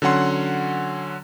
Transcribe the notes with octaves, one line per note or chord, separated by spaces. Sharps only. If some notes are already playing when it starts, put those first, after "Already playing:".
D3 F#3 C#4 F#5 C6